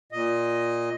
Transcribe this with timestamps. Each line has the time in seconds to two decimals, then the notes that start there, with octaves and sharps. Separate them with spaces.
0.12 A#2 D#5